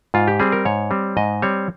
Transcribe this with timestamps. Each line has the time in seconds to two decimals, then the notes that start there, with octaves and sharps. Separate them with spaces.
0.14 G#2 F4
0.28 G4
0.40 G3 C4 G#4
0.52 A#4
0.65 G#2 C#5
0.91 G3 C4
1.17 G#2 D#5
1.42 G3 C4 C#5